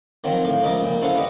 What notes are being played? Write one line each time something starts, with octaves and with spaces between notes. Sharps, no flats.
D#3 F3 F#3 C4
A2 F5
C#2 F3 A#4 D#5 E5 D6
A#1 A#2 G5
C#4 E4 A4 C5 F5 F#5
G3 B4 D#5 F#5